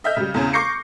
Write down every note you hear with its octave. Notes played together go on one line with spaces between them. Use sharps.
D#5 E5 F6 G6
C#3 G3
E2 C#3 C#4
C#6 D6 G6 A#6 C7 C#7